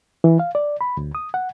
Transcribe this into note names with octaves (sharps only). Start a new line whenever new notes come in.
E3
F5
D5
B5
D2
D#6
F#5